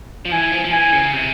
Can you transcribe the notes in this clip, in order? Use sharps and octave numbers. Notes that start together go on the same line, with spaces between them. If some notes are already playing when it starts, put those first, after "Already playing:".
F3
E3 G#5
F3
F3
E3 G#5
C#3
C3